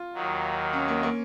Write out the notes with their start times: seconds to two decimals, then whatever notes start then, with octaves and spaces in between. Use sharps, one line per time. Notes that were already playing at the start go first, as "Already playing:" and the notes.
Already playing: F4
0.14 D#2 D#3 F#3
0.73 C#4
0.88 A#3
1.03 A#3